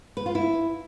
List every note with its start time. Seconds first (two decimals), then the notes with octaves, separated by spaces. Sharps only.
0.17 B4
0.26 F4
0.35 E4